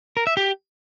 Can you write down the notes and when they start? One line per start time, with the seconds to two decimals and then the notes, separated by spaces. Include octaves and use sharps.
0.17 A#4
0.27 E5
0.37 G4